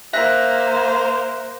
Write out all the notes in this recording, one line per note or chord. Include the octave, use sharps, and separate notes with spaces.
A#3 C5 E5 F#6 A#6